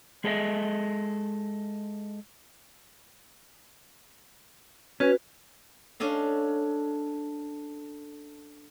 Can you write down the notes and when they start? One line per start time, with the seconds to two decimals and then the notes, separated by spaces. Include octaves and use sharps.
0.24 G#3 G#4 A4 B4 D#5 E5
5.00 C#4 F#4 B4
6.00 C#4 D4 A4 D#5 F5